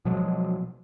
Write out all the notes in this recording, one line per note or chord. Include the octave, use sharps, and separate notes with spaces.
B2 F3 F#3 G#3